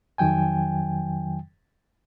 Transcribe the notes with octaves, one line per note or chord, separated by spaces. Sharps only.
F2 D#3 F#3 G5 G#5